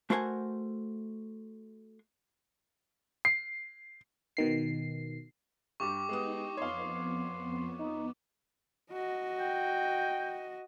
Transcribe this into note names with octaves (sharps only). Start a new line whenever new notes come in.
A3 F#4 A#4 C5 F#5 G#5
C7
B2 D#3 C7
G2 G3 G4 C#6 D6
G#3 B3 D#4 D#6
F2 B3 C#5 F5 C6
B3 D#4
F#4 D#5
G5